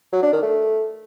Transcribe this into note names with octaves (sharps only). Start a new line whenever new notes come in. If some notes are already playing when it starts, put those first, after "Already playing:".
F#3
D4
D#3
A3